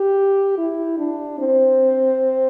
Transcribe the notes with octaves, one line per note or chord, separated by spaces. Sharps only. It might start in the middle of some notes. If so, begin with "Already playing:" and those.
Already playing: G4
E4
D4
C4